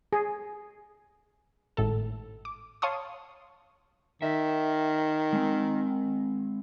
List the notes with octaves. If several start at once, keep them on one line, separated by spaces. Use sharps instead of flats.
G#4
G#1 A2 A4
D6
C#5 F5 A5 C6 C#6 D#6
D#3 E5
G#3 C4